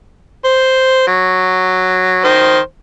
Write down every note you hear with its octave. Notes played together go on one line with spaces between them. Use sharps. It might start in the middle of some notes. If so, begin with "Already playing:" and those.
C5
F#3
D#3 C5